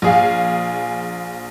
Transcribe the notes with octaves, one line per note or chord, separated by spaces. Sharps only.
A#1 G#4 F5